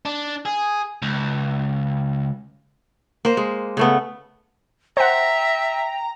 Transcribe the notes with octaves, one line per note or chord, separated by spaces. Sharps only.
D4
G#4
C#2
A#3 C5
G#3
C#3 A3 B3
C5 E5 F#5 G5 A#5